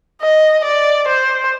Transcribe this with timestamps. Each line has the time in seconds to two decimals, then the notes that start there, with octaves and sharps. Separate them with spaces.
0.23 D#5
0.65 D5
1.08 C5